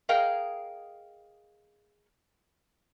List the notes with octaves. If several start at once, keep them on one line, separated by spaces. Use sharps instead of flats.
G#4 A#4 D#5 F5 G5